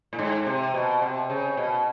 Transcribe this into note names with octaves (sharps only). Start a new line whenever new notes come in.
A2
G#2
C3
B2
C3
C#3
B2